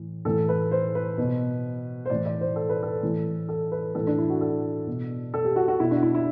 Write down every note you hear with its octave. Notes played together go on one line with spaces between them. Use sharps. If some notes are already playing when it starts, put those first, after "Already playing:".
Already playing: A2 E3
A2 E3 A4
B4
C5
B4
B2
C5
A2 E3 D5
D5
C5
A4
B4
A4
A2 E3
A4
B4
A2 E3 A4
D4
E4
F#4
A4
B2
A4
G4
F#4
F#4
B2 E4
D4
E4
E4